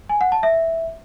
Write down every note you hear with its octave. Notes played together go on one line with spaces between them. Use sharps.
G#5
F#5
A5
E5